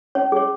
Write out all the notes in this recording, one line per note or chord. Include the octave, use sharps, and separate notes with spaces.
C#4 C#5
G#4 C#5